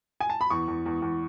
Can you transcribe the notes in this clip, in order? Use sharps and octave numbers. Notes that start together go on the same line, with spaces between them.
G#5
A5
B5
E2 C#6
E2
E2
E2